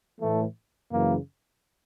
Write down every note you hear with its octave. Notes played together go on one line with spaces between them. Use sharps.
A2 E3 A3
F#2 C#3 E3 A#3